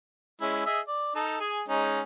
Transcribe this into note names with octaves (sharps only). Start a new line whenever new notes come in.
G#3 C#4 E4
G#4 D#5 E5
D5
D#4 A4
G#4 G#5
G#3 C#4 D#4